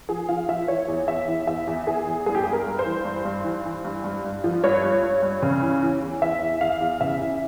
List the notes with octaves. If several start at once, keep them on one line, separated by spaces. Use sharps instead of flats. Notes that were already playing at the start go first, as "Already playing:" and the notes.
F3 G#4
F3 F5
F3 E5
E3 C#5
E2
E2 E5
E3
E2 E5
E2
E2 G#4
E2
G2 G#4
G4
G2 G#4
A#4
G2
C5
E3
G2
G2
E3
E3
G2
G2
G2
F3
G2 C#5
G2
G2
G2
C#3
E3
E3
E2
E3 E5
E2
E2 F5
E2
C#3 E5
E2